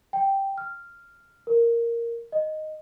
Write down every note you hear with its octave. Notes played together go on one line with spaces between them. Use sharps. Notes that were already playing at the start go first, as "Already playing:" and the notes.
G5
F6
A#4
D#5